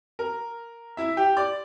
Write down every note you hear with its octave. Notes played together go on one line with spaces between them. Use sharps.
A#4
E4 E5
G4 G5
D5 D6